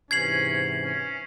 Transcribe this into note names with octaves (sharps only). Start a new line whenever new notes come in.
G#2 C3 E3 C#4 G#6 C7 F#7
C#4